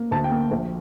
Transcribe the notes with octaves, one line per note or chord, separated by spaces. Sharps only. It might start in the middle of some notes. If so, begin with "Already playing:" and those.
Already playing: A#3
D2 A5
G5
A#3
A#1